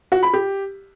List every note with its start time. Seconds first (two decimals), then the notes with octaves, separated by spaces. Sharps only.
0.12 F#4
0.23 B5
0.33 G4